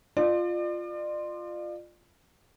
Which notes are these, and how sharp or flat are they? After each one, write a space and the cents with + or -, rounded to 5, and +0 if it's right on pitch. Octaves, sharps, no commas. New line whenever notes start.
F4 +0 D5 +40